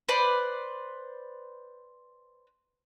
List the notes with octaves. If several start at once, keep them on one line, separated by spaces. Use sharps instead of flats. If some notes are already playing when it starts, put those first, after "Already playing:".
B4 C5 D5